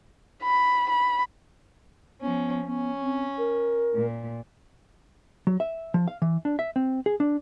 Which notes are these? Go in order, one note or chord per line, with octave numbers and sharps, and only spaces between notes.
B5
B5
F3 B3 C#4
B3 C#4
C4
A#4
A#2
F#3
E5
F3
F5
E3
D4
E5
C4
G#4
D4